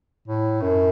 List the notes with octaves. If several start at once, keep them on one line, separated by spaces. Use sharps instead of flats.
A2
F#2